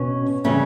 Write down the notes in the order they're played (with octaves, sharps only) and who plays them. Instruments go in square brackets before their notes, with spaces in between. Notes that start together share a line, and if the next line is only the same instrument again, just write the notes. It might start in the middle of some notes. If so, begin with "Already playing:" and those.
Already playing: [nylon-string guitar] B2 C#4
C#3 E3 G3 C#4